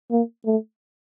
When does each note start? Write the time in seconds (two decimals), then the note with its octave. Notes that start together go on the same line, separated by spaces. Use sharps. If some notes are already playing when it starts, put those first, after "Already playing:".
0.11 A#3
0.46 A3